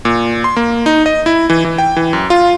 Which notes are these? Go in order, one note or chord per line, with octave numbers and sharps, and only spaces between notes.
A#2
C6
A#3
D#4
D#5
E4
E3
E3
G5
E3
F#2
F4